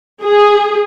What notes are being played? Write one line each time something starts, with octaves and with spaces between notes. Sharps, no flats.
G#4